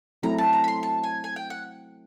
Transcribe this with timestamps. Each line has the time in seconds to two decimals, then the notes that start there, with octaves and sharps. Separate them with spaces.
0.23 F#3 A3 C4 E4 A4 A#5
0.38 A5
0.53 A#5
0.64 B5
0.68 C6
0.83 A5
1.03 G#5
1.24 G#5
1.36 G5
1.50 F#5